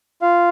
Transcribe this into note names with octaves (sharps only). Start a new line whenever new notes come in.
F4 F5